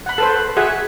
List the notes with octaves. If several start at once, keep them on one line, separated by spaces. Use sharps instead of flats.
F#5 B5
A4 B4 C5
F#4 G#4 E5 F#5